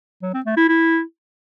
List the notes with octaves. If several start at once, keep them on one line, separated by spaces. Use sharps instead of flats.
F#3
C4
A3
E4
E4